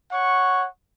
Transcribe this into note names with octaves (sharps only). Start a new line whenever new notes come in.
C#5 F#5 C#6